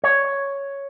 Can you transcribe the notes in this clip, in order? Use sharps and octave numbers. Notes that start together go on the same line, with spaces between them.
C#5